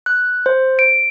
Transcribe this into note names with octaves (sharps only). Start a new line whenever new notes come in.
F#6
C5
D7